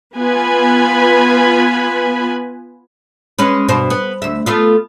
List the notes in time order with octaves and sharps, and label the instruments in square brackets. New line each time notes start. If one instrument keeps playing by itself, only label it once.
[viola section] B3 F4 B4 G#5 B5
[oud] G#3 C#4 B4
G2 B2 C5
B3
D2 E5
A3 B3 F4